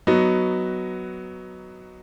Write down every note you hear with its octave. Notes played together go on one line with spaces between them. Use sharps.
F#3 B3 D#4 F#4